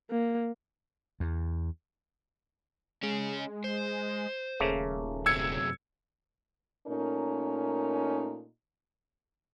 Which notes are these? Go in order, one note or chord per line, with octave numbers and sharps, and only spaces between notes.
A#3
E2
G#3 C#4 G#4
C5
D#1 C#3 A3 A#3
F#2 C3 F#3 E6 G#6 C#7
A#2 A3 C#4 D#4 A#4